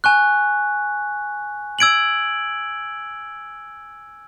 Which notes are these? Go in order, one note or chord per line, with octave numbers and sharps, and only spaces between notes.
G#5 C#6 F#6
E6 G#6 D7 F#7